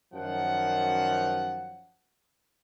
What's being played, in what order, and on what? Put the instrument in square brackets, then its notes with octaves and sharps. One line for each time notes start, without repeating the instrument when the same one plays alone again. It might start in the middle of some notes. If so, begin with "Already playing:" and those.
[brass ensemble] F#2 D#3 F3 F#5